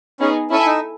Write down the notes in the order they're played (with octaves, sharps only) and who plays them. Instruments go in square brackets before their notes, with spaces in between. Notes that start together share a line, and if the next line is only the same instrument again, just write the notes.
[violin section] B3 D#4 G#4 [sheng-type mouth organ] C#4
[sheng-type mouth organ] C#4 [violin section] E4 A4 E5 G#5
[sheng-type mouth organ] D#4